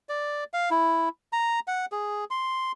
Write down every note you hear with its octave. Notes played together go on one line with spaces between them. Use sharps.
D5
F5
E4
A#5
F#5
G#4
C6